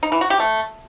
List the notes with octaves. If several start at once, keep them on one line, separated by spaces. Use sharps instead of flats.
D#4
E3
F#4
G4
A3